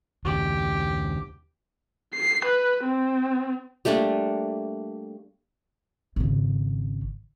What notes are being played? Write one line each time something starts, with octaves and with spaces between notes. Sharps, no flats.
D#2 C#3 G4
C7
B4
C4
G3 A3 A#3 D4
G#1 C#3